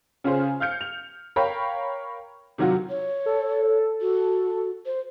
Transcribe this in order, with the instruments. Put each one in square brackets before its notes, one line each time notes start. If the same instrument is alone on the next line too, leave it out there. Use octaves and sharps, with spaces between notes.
[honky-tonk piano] C#3 C#4 F4 G#4 C5
F5 F6 G6 C#7
F7
A#4 C#5 F5 G5 B5
C3 D#3 F#3 F4 F#4
[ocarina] C#5
[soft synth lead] A4
[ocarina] F#4
C5